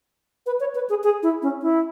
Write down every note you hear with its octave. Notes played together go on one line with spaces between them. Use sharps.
B4
C#5
B4
G#4
G#4
E4
C#4
E4